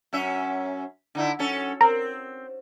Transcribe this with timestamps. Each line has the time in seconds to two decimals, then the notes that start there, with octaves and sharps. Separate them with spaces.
0.13 F#2 C#4 E5
1.15 D3 D#4 E4
1.39 F#2 C#4 A4
1.81 C4 A#4